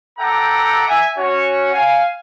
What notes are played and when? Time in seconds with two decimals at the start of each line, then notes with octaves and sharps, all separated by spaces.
0.19 A4 E5 F#5 G5 A#5 D6
0.88 E5 G#5
1.17 C#4 F#4 C#5
1.73 F5 G#5